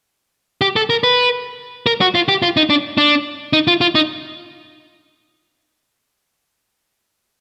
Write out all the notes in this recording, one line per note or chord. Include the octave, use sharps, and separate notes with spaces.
G4
A4
A#4
B4
A#4
F#4
F4
G4
F4
D#4
D4
D4
D#4
F4
F4
D#4